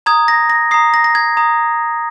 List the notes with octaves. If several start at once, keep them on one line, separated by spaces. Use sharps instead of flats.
A#5 D#6 G#6
A#6
A#6
A#5 D#6 C7
A#6
A#6
G#6
A#5 D#6